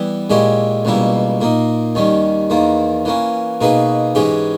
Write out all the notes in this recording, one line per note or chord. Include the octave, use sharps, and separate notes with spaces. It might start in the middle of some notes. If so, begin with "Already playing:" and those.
Already playing: E3 G3 B3 E4
A#2 G#3 C#4 E4 G4
C#2 B2 G3 A#3 E4
A#2 A#3 D#4
D#2 D#3 G3 C#4
E2 D#3 A#3
E3 A#3 C#4
B2 A#3 D#4 G#4 B4
G#2 E3 G#3 C#4 G4